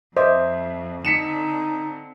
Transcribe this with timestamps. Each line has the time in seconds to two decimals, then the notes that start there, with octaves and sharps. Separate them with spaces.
0.17 F2 C5 D#5 E5 D6
1.05 D3 C4 D#4 B6 C#7 E7